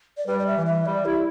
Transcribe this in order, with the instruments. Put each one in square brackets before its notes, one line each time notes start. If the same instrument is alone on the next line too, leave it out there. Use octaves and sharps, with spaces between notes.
[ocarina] D5
[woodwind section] G3 [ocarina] B4
[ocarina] D5
E5
[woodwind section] E3
[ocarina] E5
[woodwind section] G3 [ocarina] D5
[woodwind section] E4 [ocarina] G4